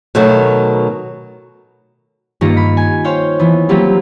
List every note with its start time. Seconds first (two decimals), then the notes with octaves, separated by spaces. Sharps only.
0.15 B2 D#3 F#3 A3
2.41 G2 D#3 A#3 F4 A#6 C#7
2.57 B5
2.77 G#5
3.04 C5 C#5 F5 G5
3.39 E3 B3
3.69 F#3 G3 A#3 C4 F4 G4